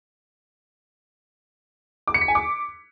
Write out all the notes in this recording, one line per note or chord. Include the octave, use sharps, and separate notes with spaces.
D6
C#7
B6
G#5
D6